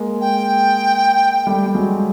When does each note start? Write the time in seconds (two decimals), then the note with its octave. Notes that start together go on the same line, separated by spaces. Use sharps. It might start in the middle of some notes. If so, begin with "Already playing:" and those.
Already playing: G#3 A#3
0.21 G5
1.47 G3 A3
1.66 G3
1.75 F#3 G#3